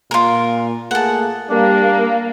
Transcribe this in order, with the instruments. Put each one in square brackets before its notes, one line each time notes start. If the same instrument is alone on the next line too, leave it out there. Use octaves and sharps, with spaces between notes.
[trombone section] A#2 [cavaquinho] F4 A#4
[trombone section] A3 A#3 G#4 [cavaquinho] F#5 A5
[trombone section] G3 [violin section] A#3 [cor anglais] D4